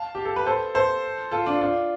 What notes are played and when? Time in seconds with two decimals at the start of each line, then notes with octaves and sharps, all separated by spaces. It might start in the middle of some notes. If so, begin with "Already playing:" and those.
Already playing: F5 A5
0.15 G4
0.25 A4
0.36 B4
0.46 A4 C5
0.75 A4 C5
1.32 F4 A4
1.46 D4 F4
1.61 D4 F4